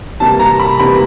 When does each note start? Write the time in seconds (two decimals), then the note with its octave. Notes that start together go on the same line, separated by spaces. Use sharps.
0.20 C3 E3 G3 A#3 A5
0.40 A#5
0.59 B5
0.79 C3 E3 G3 A#3 B5